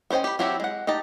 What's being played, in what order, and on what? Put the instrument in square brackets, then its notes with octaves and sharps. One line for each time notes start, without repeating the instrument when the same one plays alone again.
[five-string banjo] B3 C#4 C5 D#5 G5
G4 B5
F#3 C4 E4 F#4 G4
G#3 F#5
D#4 G4 D#5 A5